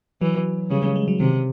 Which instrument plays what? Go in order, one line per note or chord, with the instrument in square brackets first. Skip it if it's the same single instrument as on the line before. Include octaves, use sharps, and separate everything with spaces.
[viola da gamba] E3 [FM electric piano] F#3
[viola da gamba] C#3 [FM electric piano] G3
[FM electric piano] G#3
G#3
F#3
[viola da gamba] C3 [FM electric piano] D#3